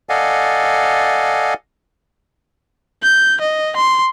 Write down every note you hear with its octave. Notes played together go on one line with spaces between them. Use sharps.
A4 D5 D#5 F5 F#5 G#5
G6
D#5
C6